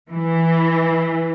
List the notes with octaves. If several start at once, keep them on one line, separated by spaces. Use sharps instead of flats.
E3